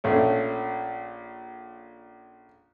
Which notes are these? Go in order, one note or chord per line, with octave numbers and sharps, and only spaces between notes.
A#1 A3 C#4